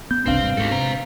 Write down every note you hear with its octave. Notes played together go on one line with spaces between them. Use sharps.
B3 G6
G1 C#2 C3 B3 C4 D4 F5
G2 C3
G#2 F#4 A4
C3 C5 A#5